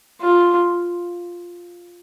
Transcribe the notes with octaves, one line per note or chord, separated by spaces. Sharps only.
F4